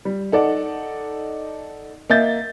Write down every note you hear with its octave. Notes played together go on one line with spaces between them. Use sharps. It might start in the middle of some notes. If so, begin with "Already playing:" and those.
G3
D#4 A4 D5 F#5
A#3 D#5 E5 G6 A6